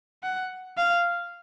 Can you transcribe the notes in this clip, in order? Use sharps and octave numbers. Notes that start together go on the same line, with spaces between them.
F#5
F5